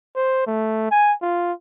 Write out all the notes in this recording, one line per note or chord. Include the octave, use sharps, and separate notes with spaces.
C5
A3
G#5
F4